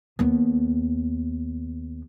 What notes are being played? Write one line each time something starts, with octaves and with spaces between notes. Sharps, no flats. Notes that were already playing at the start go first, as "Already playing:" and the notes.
D#2 B3